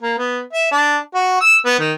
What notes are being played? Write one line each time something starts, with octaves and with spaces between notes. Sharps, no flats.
A#3
B3
E5
D4
F#4
E6
B3
D#3